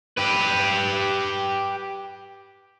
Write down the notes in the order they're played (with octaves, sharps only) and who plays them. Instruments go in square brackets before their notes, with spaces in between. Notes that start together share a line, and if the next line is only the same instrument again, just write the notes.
[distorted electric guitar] G4 B4